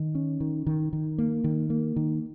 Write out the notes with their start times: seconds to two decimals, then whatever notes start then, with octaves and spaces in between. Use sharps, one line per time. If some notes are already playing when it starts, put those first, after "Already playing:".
Already playing: D#3
0.15 C#4
0.40 D#3
0.66 D#3
0.93 D#3
1.18 A#3
1.44 D#3
1.70 A#3
1.96 D#3